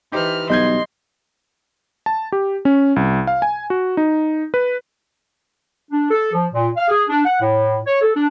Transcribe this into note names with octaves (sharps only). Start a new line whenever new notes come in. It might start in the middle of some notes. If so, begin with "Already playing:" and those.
E3 D#4 G4 B4 C5 F6
B1 G3 D#5 C6 G6 G#6
A5
G4
C#4
C2
F5
G#5
F#4
D#4
B4
D4
A4
F3
A#2
F5
G#4
D4
F#5
A2
C#5
A4
D4